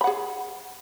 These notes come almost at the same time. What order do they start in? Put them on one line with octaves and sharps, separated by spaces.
B5 F#5 G#4